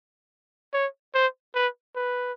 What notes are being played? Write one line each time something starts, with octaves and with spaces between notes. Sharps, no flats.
C#5
C5
B4
B4